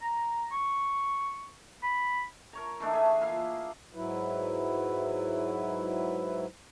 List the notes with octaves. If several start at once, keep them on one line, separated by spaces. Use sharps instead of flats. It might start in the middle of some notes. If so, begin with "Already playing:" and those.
A#5
C#6
B5
A#4 C#5 A#5
E3 A3 D4 D#4
G#4 A4 E5
A#3 F4 E5 F5
G#2 F#3 E4 B4